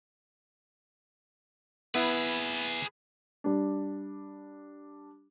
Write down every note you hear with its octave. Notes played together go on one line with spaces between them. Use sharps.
B3 E4 G#4 B4
G3 D4